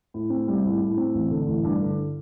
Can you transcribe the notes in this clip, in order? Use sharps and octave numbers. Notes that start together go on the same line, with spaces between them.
A2
C4
G3
A2
A2
C4
A1
D3
A1
G2
D3